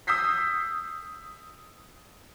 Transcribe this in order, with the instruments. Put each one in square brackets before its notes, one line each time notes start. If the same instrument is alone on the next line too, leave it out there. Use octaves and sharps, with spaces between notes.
[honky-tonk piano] D#6 E6 G6 B6 C7